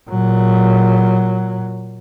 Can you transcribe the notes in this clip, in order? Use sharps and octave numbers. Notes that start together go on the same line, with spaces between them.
A#2 F#3